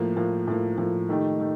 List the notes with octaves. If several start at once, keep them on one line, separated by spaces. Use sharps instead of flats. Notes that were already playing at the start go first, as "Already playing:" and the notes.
Already playing: A2 F3 A#3
A2 F3 A#3
A2 F3 A#3
A2 F3 A#3
D#3 A3 D#4 G4
D#3 A3